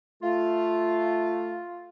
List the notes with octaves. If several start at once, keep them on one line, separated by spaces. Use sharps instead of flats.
A3 F4